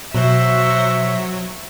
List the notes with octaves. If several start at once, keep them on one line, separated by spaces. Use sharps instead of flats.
B2 F#3 F#4 C5 E5 C#6